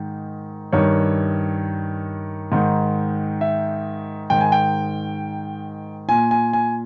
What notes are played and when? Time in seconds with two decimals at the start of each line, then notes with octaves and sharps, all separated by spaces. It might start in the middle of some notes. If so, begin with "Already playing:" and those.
Already playing: G#2 D#3
0.73 G2 D#3 C#5
2.52 G#2 D#3
3.41 E5
4.30 G#2 D#3 G5
4.41 G#5
4.52 G5
6.09 A#2 G#5
6.31 G#5
6.53 G#5